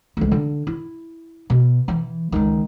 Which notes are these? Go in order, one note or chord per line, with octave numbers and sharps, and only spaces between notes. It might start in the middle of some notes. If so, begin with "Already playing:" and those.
C#2 A3
D3
E4
B2
E3
C#2 D#3